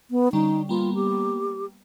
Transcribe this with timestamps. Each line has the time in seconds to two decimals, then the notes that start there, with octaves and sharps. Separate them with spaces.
0.11 B3
0.33 D3 G3 C#4 D#4
0.69 G3 A#3 B3 F4
0.95 G4